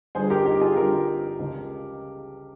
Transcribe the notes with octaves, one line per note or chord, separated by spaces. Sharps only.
G1 G2 F3 G#4 C5
G4 A#4
D#4 G4
F4 G#4
G1 G2 F3 G4 A#4
C#2 C#3 F3